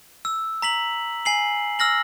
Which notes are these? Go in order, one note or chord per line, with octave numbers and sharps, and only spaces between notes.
E6
A#5 B6 F#7
G#5 C7 F#7
E6 F6 A#6 F#7